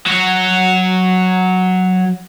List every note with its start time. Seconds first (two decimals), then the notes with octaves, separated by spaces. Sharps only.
0.07 F#3 F#4